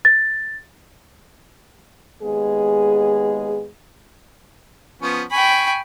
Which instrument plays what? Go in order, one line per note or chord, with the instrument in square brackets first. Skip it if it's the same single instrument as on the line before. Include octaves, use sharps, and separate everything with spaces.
[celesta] A6
[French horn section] D#2 G#3 B3 G#4
[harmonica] F3 B3 C#4
[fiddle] G5 B5 [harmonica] G#5 C#6